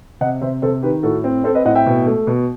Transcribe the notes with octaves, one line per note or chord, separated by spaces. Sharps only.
C3 D#5 F#5
C3 C5 E5
C3 A4 C5
D#3 G4 B4
A2 F#4 A4
C4
C4 A4 C5
B4 D#5
A2 D#5 F#5
E5 G5
B2
A3
B2